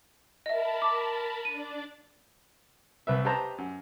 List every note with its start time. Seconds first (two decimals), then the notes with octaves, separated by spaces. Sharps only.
0.46 A#4 D#5 E5 A5 B5
0.82 D6
1.45 D4 D5 D#7
3.07 C2 B4 E5
3.25 G4 B4 C5 D#5 A5 A#5
3.58 F#2